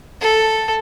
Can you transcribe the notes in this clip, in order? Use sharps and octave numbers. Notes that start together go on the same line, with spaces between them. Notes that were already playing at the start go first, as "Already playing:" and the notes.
A4